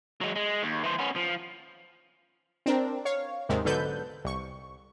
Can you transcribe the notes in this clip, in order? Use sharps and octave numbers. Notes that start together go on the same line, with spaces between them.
F#3 G#3
G#3
D#2
E3 C5
B3 C#4
F3
C4 D4 A#4
C#5 F5
D#2 G#2 C3 D#3
B1 G#2 D3 A4 B4 G6
C2 C#6